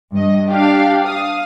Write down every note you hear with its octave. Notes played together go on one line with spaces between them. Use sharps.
G2 D#5
D4 G4 F5
F5 D#6